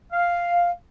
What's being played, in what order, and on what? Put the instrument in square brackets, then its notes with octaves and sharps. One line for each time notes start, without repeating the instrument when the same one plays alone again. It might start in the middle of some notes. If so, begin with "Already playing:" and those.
[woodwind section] F5